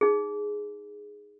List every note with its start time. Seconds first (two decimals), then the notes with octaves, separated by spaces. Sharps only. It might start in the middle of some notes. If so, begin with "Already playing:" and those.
0.01 D#4 G#4